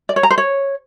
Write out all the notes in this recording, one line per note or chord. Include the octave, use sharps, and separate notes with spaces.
D5
C#5
A#5
C5
C#5